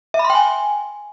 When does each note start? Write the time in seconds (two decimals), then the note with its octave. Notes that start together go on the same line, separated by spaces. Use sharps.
0.14 E5
0.19 B5
0.25 C6
0.30 G5
0.35 G#5